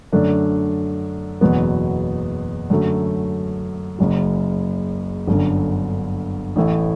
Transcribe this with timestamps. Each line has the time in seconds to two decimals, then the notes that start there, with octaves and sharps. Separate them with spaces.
0.13 F#2 D3 A3 D4
1.41 F#1 E2 B2 F#3 B3
2.70 F#2 D3 F#3 A3
3.98 F#1 F#2 C#3
5.27 G1 F#2 D3
6.56 A1 A2 E3 A3 E4